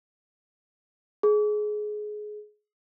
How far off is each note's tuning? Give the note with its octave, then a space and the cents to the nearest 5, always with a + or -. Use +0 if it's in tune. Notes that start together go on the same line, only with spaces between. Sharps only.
G#4 +20